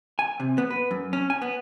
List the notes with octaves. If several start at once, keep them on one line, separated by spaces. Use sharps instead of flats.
G#5
C3
B3
B4
F#2
C#4
G#5
B3